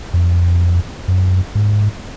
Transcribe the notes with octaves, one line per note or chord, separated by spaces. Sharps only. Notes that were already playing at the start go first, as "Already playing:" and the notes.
F2
F#2
G#2